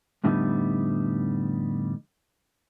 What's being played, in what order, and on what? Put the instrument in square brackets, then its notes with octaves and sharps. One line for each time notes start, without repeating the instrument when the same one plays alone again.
[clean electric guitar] F2 A2 D3 G3 B3 D#4